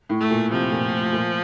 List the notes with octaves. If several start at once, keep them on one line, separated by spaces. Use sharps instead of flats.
A2
A3
A#2
C3 F3
A#2
A#2